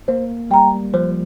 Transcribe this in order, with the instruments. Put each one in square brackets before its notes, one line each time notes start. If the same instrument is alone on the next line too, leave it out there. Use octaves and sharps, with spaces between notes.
[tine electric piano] A#3 [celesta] C5
[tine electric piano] G3 [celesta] G5 A#5
[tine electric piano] F3 [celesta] C5